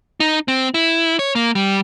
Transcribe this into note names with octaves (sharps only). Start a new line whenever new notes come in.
D#4
C4
E4
C#5
A#3
G3